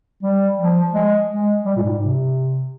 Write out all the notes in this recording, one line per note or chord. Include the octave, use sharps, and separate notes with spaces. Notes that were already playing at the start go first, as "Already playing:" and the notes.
G3
F3
G#3
G#3
G3
A#2
G#2
C3